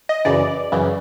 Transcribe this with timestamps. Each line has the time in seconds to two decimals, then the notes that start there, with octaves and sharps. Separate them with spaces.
0.09 D#5
0.25 F#2 C#3 E3 D5
0.72 F#2 C#3 E3